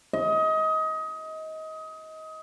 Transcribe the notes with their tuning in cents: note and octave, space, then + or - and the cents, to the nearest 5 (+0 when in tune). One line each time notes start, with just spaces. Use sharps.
D#5 +25